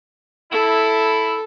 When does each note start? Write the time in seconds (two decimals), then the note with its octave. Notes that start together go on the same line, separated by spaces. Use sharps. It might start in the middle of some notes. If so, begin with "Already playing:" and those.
0.52 E4 A4